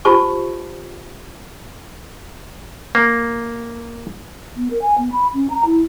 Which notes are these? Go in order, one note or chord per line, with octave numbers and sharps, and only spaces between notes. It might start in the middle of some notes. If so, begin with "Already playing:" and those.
F4 G4 C5 A5 C#6
A#3
B3
A#4
G#5
B3
B5
C#4
A#5
E4